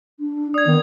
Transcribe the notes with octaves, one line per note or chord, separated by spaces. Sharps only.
D4
D5 D#6 G#6
D#3 B3